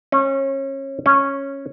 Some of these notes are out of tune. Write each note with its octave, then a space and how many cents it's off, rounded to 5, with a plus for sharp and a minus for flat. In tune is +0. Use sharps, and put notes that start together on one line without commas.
C#4 -30
C#4 -10